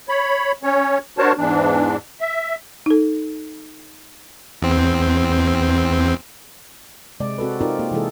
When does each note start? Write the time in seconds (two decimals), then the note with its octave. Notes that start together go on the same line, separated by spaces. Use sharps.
0.09 C#5 B5
0.63 C#4 C#5
1.18 D4 F#4 A#4 C5 C#5 A5
1.38 E2 G#2 E3 D4
2.21 E5
2.86 D#4 A4
4.62 E2 C4
7.20 C3 G#3 D5
7.38 C4 F#4 A4 B4
7.61 C4 D#4 F4 G4 A#4 D5
7.79 A#3 G4
7.92 C3 E3 G#3 E4 G#4 A4